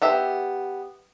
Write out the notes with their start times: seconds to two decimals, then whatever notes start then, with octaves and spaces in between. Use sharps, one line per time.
0.02 B3 G4 E5